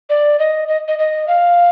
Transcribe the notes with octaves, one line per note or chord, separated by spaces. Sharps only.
D5
D#5
D#5
D#5
D#5
F5